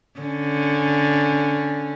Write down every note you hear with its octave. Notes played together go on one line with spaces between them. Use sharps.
D3 C#4